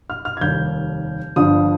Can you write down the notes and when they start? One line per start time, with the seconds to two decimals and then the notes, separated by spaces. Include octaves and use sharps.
0.10 F6
0.25 F6
0.37 G#6
0.41 F1 D#2 D#3 G3 G6
1.36 G1 G2 F3 D#6